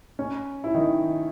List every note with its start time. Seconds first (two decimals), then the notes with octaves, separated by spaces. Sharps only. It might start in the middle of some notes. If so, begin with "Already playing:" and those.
0.19 C#4
0.64 E4
0.74 D#3 D#4